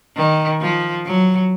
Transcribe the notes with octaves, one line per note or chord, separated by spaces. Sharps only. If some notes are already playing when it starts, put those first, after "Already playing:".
D#3
F3
F#3